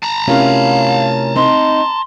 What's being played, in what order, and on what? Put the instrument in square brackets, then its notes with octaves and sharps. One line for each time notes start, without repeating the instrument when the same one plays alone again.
[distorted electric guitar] A5 A#5
[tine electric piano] C3 E4 A#4 [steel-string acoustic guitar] A3 C#4 F4 [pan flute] F5
[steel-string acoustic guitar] C4 D#4 [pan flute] C6